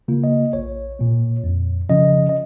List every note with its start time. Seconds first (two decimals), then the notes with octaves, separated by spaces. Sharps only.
0.08 C#3 A#3 F4
0.24 D#5
0.53 A#1 C#5
0.99 A#2 A#3
1.44 F2
1.89 C#3 F3 C#4 D#5
2.29 D#5